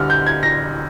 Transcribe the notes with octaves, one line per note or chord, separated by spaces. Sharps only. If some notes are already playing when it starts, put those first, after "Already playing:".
Already playing: D2 D3 G3 F6
G6
G#6
A#6